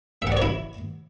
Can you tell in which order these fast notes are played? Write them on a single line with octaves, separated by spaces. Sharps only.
E5 F#5 D5 C#5 E4